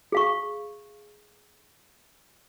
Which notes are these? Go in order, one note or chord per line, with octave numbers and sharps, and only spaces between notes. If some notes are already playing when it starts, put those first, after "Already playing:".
G#4 F5 C#6